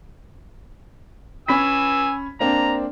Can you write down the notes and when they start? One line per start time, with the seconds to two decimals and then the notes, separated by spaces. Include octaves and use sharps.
1.48 C#4 G#5 B5 E6 B6
2.40 A#3 C4 D4 A#5